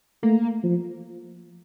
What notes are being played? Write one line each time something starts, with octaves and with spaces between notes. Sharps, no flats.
A3 A#3
F3